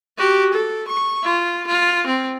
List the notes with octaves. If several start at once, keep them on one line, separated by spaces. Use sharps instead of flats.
F#4 G4
A4
C#6
F4
F4
C4